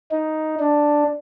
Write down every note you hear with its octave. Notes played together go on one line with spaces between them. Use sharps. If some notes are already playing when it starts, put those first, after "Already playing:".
D#4
D4